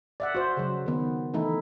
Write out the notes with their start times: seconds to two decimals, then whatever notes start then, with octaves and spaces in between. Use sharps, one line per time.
0.20 D5 E5 F#5
0.35 F#4 C5
0.57 C#3 F#3
0.86 D#3 B3
1.34 E3 A3 D#4 E4